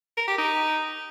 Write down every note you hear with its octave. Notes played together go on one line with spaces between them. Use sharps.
A#4
G4
D#4